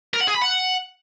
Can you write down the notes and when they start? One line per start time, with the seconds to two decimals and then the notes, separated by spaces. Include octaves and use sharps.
0.14 A#4
0.21 F#5
0.28 G#4
0.35 B5
0.42 F#5